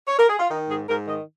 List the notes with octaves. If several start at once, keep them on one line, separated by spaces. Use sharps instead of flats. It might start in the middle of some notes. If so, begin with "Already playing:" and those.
C#5
A#4
G#4
F4
D#3 D#4
G#2 G#4
G#2 A#4
D#3 D#5